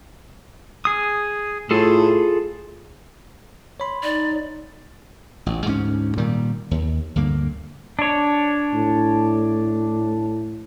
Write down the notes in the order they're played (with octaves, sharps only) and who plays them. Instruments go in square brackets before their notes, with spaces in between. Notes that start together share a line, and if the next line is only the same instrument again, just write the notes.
[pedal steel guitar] G#4 D#6
[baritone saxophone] A2 [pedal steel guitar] F4 G#4 A4
[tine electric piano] C#5 B5 C6
[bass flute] D#4 [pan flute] D5
[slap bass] A1
D2 G#2 A3 C#4
A#2 D#3 G3
D#2
D2 G2 D3 A#3
[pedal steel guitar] D4 C#5
[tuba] A2